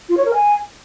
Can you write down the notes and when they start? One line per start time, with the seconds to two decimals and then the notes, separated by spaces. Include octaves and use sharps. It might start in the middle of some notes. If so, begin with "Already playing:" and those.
0.09 F4
0.17 C#5
0.25 A#4
0.34 G#5